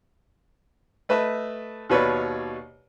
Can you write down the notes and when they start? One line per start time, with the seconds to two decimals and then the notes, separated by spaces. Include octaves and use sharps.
1.09 A3 B4 D#5 E5
1.90 D#2 B2 B4 C#5 D5